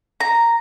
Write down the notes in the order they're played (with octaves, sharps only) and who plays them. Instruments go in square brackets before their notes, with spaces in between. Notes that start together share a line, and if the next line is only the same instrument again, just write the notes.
[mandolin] A#5